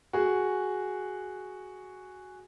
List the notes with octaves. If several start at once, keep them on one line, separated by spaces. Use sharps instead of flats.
F#4 G#4